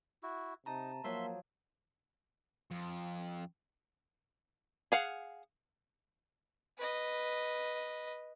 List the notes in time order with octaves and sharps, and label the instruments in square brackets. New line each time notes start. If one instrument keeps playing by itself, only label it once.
[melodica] E4 F#4
[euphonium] C3 [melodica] D#4 [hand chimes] A5 A#5
[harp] F3 F#3 [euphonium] A#3 [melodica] E5 C6
[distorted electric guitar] F2
[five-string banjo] G#4 F5 F#5
[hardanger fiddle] B4 D#5